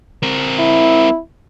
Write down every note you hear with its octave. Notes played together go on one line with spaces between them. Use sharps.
C4 A#4
E4